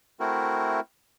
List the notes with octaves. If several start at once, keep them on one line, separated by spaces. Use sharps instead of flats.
A3 C4 E4 F#4 A#4